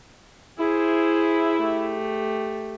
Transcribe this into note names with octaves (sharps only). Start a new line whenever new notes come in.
E4 G#4 C5
A3 G4